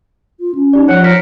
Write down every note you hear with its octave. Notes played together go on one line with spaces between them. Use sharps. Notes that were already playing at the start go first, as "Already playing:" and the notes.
F4
C#4
D#4 G4 D5
F3 C#5 F#5
A#4 B6